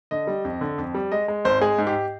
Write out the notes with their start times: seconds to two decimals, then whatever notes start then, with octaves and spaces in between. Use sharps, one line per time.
0.11 D3 D#5
0.27 G3
0.45 F2
0.61 D3
0.78 F2
0.94 G3
1.12 G#3 D#5
1.28 G#3
1.45 G#1 C5
1.61 G#3 G#4
1.78 G#2
1.87 G4